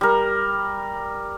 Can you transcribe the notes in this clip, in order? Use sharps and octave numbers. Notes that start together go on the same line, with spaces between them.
G3 A#4